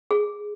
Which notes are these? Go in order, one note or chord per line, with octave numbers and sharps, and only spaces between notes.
G#4